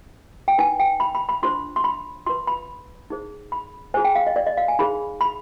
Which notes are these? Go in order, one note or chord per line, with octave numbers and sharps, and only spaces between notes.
G5
D#4 B4 G#5
G5
B5
B5
B5
D4 F4 C5 C6
C6
B5
F4 B4 C6
B5
D#4 G#4 C5
B5
F4 G#4 C5 G#5
G5
F5
D#5
D5
D#5
F5
G#5
D#4 G#4 C5 B5
B5